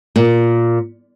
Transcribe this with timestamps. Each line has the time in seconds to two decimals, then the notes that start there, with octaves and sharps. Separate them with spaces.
0.16 A#2